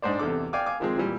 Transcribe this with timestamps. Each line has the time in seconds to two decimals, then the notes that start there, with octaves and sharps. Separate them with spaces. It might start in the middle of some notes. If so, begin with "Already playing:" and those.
0.02 G#2 D4 C5 D5
0.19 E2 C3 A4 D6
0.53 D5 F5 G5 G#5 D6
0.66 F5 G#5 D6
0.80 D#3 F3 G#3 C4 G#4
0.97 A#2 E3 G3